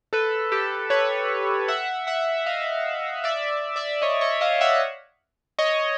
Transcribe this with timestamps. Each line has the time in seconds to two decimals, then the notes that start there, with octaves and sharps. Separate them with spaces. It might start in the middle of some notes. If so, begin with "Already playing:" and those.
0.13 A4 B4
0.52 G4 A4
0.90 B4 C#5
1.68 E5 F#5
2.07 E5 F#5
2.46 D#5 F5
3.24 D5 E5
3.76 D5 E5
4.02 C#5 D#5
4.21 C#5 D#5
4.41 D#5 F5
4.61 E5 F#5
5.59 C#5 D#5